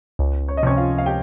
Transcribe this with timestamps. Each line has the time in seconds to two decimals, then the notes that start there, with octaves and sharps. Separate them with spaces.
0.19 C#2
0.48 C#5
0.57 D#5
0.63 C3 F3 C#4 C#5
0.77 F4 F5
0.98 F5
1.06 G4 G5